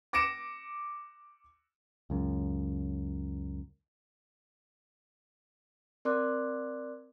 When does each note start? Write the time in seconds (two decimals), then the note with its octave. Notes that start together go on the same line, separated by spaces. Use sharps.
0.13 D6 A#6 C#7 D7 E7
2.10 C#2 F#2
6.05 C4 A#4 D5 C6 D6 F#6